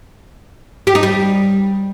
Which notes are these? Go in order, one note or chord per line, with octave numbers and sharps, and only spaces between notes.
G4
D#4
G3